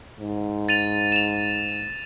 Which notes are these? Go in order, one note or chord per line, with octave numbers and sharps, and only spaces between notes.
G#2
A6 D#7 F7
E7 F7